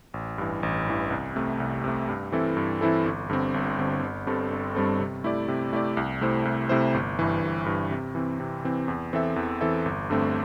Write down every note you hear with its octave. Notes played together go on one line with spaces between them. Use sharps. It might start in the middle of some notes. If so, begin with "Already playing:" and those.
A1
G2 E3
A1
G2 E3
C2
C3 A3
C2
C3 A3
G2
E3 C4 E4 A4
G2
E3 C4 E4 A4
G1
G2 D3 C4
G1
G2 D3 C4
G1
G2 G3 C4 A4
G1
G2 G3 C4 A4
C3
A3 E4 G4 D5
C3
A3 E4 G4 D5
C2
C3 A3 E4 C5
C2
C3 A3 E4 C5
G1
G2 E3
G1
G2 E3
C3
E3 C4
C3
E3 C4
E2
E3 C4 A4 E5
E2
E3 C4 A4 E5
G1
G2 D3 A3 C4